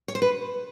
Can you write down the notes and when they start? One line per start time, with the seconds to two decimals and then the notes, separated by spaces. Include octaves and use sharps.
0.08 C#5
0.15 C5
0.22 B4